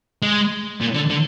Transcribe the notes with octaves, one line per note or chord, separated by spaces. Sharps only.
G#3
A#2
D3
D3